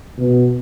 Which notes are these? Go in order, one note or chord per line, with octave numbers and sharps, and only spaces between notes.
B2